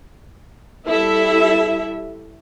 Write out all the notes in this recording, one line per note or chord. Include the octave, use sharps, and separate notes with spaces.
G3 E4 A4 E5